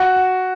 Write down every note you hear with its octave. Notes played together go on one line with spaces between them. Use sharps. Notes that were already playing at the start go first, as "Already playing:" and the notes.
Already playing: F#4